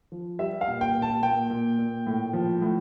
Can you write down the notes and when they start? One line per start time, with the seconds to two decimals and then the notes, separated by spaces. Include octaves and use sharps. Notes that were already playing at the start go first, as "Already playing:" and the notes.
0.12 F3
0.39 G3 E5
0.61 F5
0.68 A#2
0.81 G5
0.95 A#2
1.02 A5
1.22 A#2 G5
1.50 A#2
1.79 A#2
2.07 A2
2.33 F3
2.62 A2